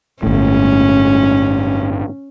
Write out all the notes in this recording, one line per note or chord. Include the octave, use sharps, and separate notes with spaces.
G1 A2 C#4